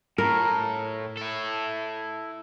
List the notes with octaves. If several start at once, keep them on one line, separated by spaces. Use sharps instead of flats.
A2 A#4
E4 A4